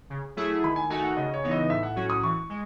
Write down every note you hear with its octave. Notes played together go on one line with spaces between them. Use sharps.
C#3
F#3 A3 E4 G#4
D#3 B5
G#5
A3 D#4 F#4 G#5
F#5
C#3 D#5
C#5
E3 B3 D#4
D#5
A2 E5
F#5
F#3 C#4 F#4
D#6
E3 C#6
G#3